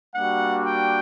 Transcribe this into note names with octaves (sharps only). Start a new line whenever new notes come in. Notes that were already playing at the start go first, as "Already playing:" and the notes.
G3 A#3 D4 F#4 F#5
G5